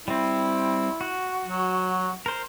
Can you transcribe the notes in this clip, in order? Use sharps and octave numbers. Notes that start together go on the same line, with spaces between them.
G3 C4 E4
F#4
F#3
A#4 C5